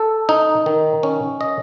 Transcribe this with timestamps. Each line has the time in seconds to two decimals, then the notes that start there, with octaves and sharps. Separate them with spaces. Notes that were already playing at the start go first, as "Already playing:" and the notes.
Already playing: A4
0.29 D#4
0.66 D#3
1.03 C#4
1.41 D#5